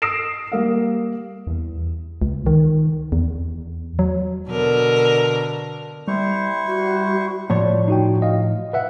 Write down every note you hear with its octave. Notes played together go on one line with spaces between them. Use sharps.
D#6 E6 A#6 C7 D7 E7
G3 A#3 F5
E2
C#2
D#3
E2
F#3
B2 D3 A#4
G3 E4 C5 C#6
F#4
A2 F3 C#5 D5
D#4 F#4 G5
D#5 F5
B4 E5 F#5